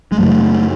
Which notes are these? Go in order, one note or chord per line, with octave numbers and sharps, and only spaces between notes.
G#3
F#2 C#3 F#3 A3